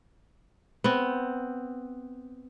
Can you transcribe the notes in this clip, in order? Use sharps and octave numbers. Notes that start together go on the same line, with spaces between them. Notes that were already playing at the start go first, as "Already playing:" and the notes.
B3 C4